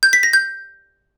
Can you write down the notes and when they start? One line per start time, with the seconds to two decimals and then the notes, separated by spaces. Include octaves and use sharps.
0.03 G6
0.13 B6
0.23 A#6
0.33 G6